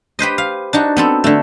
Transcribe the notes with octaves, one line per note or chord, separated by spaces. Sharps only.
G4 B4 C5 D#5
F5
D4 D#4 F#4
B3 C4 A4
D3 A3